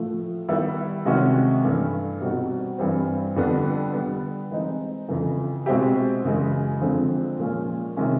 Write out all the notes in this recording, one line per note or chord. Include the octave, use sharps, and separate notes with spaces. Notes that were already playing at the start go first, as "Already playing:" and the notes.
Already playing: A2 F3 A3
D#3 G3 B3 E4 G4
C3 D#3 G#3 C#4 F#4
G2 E3 A3 D4
B2 G3 C4 D#4 F#4
G2 E3 G3 C4
F2 D3 G3 B3 D4
D3 G3 B3
E3 G#3 C4 D#4
F2 C#3 E3
B2 G#3 C4 E4 G4
F#2 C#3 E3 G#3
F2 D3 F3 G#3 C4
A#2 F3 G#3 C#4
C3 D#3 G#3 C#4